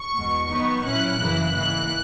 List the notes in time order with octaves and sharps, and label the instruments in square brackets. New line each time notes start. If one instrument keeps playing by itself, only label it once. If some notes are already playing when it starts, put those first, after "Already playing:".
Already playing: [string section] C#6
E2 B2 G#3
D#3 F#3 B3 D#4
A#2 F#3 C#4 E4 F#6
F#2 C#3 E3 A#3 E4
G#2 E3 A#3 E4 F#6